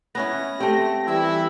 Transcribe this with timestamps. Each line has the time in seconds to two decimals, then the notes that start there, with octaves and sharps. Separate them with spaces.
0.15 B3 C#4 E4 A#6
0.60 A3 C4 G4
1.07 E3 G3 E4 E6